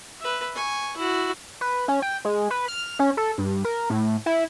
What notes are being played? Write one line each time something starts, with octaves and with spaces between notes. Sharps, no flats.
B4 E5
G#5 C#6
E4 F#4
B4
C#4
G5
G#3
B4
F6
C#4
A4
G2
A#4
A2
E4